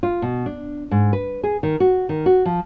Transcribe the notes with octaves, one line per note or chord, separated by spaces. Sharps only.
F4
B2
D4
G#2
B4
G#4
D#3
F#4
D#3
F#4
F3